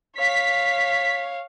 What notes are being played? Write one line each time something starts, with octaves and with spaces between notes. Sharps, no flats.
C#5 F5 B6